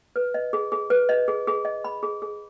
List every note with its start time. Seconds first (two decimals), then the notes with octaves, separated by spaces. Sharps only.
0.16 B4
0.34 D#5
0.53 G#4
0.72 G#4
0.90 B4
1.09 D#5
1.28 G#4
1.47 G#4
1.65 D#5
1.84 B5
2.03 G#4
2.22 G#4